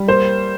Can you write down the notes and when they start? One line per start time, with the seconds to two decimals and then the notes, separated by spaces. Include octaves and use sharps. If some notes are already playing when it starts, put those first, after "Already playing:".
Already playing: G3
0.08 A#3 C5